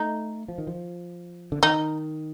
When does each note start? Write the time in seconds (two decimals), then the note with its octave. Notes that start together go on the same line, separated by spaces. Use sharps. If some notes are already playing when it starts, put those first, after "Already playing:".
Already playing: A3 D#4
0.48 F3
0.58 D#3
0.67 F3
1.52 D3
1.63 D#3 D#4